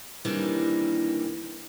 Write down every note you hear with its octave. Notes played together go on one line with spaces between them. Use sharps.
C3 D#3 E3 G3 A#3 D4